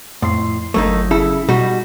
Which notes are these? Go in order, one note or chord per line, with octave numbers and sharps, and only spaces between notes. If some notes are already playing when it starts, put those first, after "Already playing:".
F2 A2 C6 C7
G1 F#3 A3 A#3 D#4
C#3 E4 A4
B2 G3 D#4 F#4